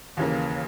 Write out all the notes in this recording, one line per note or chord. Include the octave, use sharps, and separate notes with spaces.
D#2 C#3 E3 A#3